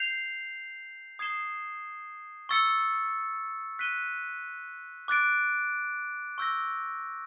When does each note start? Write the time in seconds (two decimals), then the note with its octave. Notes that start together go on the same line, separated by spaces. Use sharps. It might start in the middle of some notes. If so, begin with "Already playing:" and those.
Already playing: G6 C7 F7
1.19 D#6 G#6 C7 E7 G7
2.49 C#6 E6 A6 C#7
3.79 F#6 B6 D#7 G7
5.08 D6 F#6 A6 D7
6.38 C#6 E6 G6 A#6